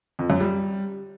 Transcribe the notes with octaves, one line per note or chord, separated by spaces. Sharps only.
F2
F#2
G3